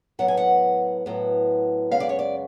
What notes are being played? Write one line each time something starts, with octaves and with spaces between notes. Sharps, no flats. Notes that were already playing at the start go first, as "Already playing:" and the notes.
A2 F#3 B3 F#5
G#5
F#5
A2 F#3 B3
F#2 C#3 G#3 B3 F5
D5
C#5
D5